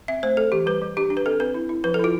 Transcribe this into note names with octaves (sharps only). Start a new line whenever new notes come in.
C4 E5
A3 C5
A3 A4
E3 G4
G3 B4
G3
D4 G4
D4
B4
C4 A4
C4 B4
E4
E4
F3 B4
A4
E4 F4